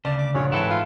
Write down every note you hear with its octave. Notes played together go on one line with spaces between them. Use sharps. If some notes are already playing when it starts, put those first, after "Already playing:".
D2 C#3 D5 A5
D6
A#1 G2 D3 F#3 C#4 C#5
G#2 E3 C4 E4 A4 B4
F4